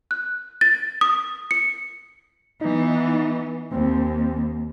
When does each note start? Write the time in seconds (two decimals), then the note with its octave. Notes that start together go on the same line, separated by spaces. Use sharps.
0.11 F#6
0.61 A6
1.01 D#6
1.51 C#7
2.61 E3 B3 D#4
3.72 D#2 C4